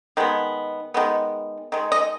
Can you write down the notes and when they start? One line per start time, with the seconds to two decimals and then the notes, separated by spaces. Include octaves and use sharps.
0.17 D#3 G#3 B3
0.94 D#3 G#3 B3
1.72 D#3 G#3
1.92 D#5